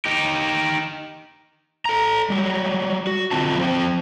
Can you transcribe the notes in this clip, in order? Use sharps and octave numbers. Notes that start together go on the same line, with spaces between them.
D#4 G4
A4 A#5
F#3 G3
F#4
D3 C4 F4 A5
F3 C4 C5 G5